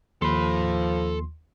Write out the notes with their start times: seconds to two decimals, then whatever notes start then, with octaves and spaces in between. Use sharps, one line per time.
0.22 D#2 F3 A4 B5 C6